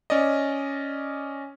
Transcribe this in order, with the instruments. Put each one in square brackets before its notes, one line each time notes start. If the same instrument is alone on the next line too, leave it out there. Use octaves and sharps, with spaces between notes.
[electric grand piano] C#4 D5 D#5